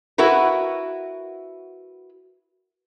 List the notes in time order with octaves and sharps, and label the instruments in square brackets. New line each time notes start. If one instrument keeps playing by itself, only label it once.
[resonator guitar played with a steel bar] E4 F#4 A#4 B4